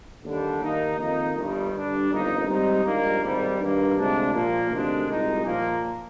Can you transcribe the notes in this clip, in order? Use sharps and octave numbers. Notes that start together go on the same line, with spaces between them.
D#2 D3 G3 D4
D#2 D#3 A#3 D#4
F2 D#3 A#3 D#4
G1 G2 D#3 G3
G2 D3 G3 D4
G1 F2 D#3 A#3 D#4
G#2 G3 C4 D#4
A#1 G#2 D#3 G3 A#3
G#1 G#2 D#3 G3
G2 D#3 A#3
D2 C3 F3 G#3 D4
A#2 F3 A#3
D2 C3 D#3 G#3 D4
C2 A#2 G#3 D#4
A#2 F3 A#3